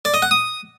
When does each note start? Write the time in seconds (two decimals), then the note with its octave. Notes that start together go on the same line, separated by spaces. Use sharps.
0.05 D5
0.14 D#5
0.22 F#5
0.31 D#6